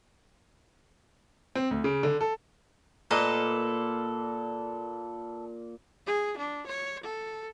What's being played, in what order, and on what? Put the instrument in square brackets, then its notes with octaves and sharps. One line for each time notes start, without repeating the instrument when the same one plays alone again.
[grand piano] C4
D2
C#3
D3
A4
[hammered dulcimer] A#2 [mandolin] A4 [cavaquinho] B4 D#5 A#5
[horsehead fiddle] G#4
D4
C#5
A4